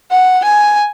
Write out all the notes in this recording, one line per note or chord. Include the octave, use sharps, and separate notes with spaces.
F#5
G#5